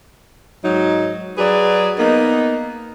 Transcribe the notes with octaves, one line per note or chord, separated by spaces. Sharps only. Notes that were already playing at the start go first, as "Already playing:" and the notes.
G#2 F#3 D#4
F#3 G#4 B4 D5
A#3 B3 D#4